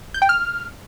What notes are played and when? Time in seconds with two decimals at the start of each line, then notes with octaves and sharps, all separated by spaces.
0.14 G6
0.22 G5
0.29 F6